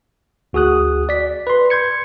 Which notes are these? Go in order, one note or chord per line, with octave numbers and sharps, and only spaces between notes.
D2 F#4 G#4 D#6 F#6
D5 B6
B4 C6
C6 G6 G#6 C#7